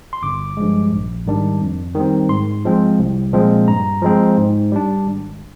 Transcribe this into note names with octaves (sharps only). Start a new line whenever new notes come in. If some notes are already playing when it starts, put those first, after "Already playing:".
C6
G1 D6
G2 F3 G#3
A#1
G#2 D#3 G3 D4
F2
D#3 G3 C4
G#2 C6
F3 G#3 C4
C2
A#2 F3 G#3 C4
G2 A#5
F3 G#3 C4
G#2
G3 D4
G#1